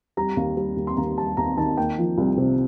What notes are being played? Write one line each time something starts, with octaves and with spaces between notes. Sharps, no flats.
G3 A#5
D#2
G3
D#2
C6
D#2 A#5
G3 A5
D#2 A#5
D#3 A5
A#3 G5
F3
C2
C3